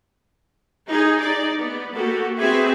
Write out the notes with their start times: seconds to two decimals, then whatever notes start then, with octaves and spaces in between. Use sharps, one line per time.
0.88 D#4 G#4
1.20 D#4 D5
1.59 B3
1.93 A#3 F#4 G4 A4
2.39 C4 F#4 G#4 B4 E5 G#5